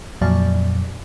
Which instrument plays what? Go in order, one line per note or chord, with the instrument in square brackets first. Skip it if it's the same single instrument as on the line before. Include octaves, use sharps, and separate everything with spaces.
[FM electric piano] F2 A#2 F#3 D5